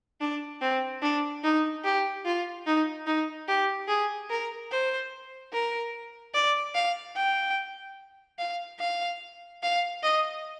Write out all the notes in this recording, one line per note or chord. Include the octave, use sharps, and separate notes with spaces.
D4
C4
D4
D#4
G4
F4
D#4
D#4
G4
G#4
A#4
C5
A#4
D5
F5
G5
F5
F5
F5
D#5